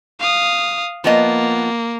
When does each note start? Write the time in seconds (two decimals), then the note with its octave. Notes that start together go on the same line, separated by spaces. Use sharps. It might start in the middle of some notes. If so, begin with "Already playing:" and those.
0.20 F5 D#6
1.04 F3 A#3 B3 D#5